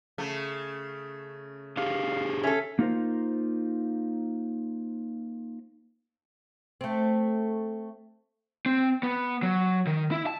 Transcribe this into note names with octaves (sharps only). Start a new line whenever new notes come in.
C#3 A3
D4 G4 G#4 F5
C#4 A4 E5
A#3 D#4 F4 F#4 A#4 C5
A3 C4
C4
B3
F#3
D#3
E4
A5